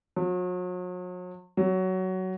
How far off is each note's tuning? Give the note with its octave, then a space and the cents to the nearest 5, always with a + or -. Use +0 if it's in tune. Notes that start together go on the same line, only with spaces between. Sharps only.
F#3 -40
F#3 +15